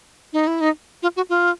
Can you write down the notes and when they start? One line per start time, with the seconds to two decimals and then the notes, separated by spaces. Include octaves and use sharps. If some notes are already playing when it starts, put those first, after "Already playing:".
0.33 D#4
0.47 E4
0.61 D#4
1.03 F4
1.17 F#4
1.29 F4